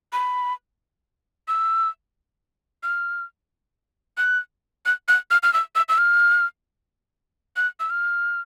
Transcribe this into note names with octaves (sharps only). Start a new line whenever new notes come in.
B5
E6
F6
F#6
F#6
F#6
F6
F6
E6
E6
E6
F6
F#6
E6
F6